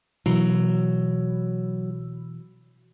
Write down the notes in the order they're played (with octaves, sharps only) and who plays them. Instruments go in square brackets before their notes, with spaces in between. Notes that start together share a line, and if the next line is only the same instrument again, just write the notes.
[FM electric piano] B2 E3 [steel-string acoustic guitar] F#3